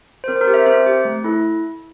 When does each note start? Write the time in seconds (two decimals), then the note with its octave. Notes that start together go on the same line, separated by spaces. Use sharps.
0.24 C5
0.28 C4 A#4
0.36 C5
0.41 A#4
0.47 G4
0.54 C5 E5
0.66 C4 C5 E5
0.87 G4
1.05 A3
1.24 E4 A4